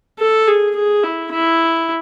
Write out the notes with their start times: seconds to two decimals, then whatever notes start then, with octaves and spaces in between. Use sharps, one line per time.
0.19 A4
0.48 G#4
0.76 G#4
1.03 E4
1.32 E4